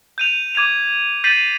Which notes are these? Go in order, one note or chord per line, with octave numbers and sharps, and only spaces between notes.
G6 D#7 F7
D6 G#6 D#7 F7
G6 A6 B6 C7 D#7 F#7